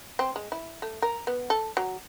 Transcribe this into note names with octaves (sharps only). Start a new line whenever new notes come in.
C4
G#3
E4
A3
A#4
B3
A4
F#3